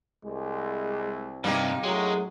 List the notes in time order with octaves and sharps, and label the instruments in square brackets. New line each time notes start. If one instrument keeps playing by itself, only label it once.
[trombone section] C2 [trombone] G#3
[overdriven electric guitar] G2 C3 [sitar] A#3 D#4 G4
[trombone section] F#2 A2 [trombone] F#3 [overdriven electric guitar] G#3